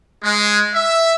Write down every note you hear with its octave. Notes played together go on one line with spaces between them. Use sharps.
G#3
E5